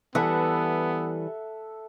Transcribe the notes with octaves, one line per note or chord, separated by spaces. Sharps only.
E3 G3 B3 A4 E5 F#5